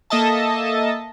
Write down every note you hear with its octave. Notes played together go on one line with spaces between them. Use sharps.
A#3 A4 D#5 E5 A5